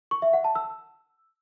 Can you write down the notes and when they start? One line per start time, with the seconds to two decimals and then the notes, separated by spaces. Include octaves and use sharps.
0.11 C#6
0.22 E5
0.33 F#5
0.44 A5
0.55 E6